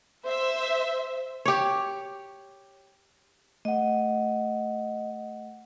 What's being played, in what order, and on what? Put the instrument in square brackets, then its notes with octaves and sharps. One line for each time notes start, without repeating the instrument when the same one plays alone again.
[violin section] C5 E5
[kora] G4 C#5
[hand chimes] A3 F#5 [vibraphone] D#5